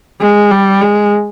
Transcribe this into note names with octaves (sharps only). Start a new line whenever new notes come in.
G#3
G3
G#3